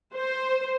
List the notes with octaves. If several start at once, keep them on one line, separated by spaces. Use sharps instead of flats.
C5